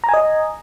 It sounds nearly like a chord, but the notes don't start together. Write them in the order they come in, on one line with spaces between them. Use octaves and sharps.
A#5 G#5 D#5